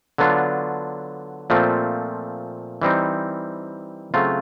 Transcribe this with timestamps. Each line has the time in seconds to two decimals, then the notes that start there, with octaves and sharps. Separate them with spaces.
0.18 D3 F#3 B3 D4 F4
1.50 A#2 F3 A3 C4
2.82 E3 G3 C4 D#4
4.14 C#3 F#3 A3 C4 F4